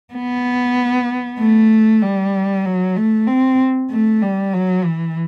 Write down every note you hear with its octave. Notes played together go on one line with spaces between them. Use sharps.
B3
A3
G3
F#3
A3
C4
A3
G3
F#3
E3